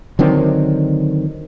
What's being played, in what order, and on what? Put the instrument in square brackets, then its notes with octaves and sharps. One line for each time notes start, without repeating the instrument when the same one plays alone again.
[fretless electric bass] D3 D#3 F#3 C4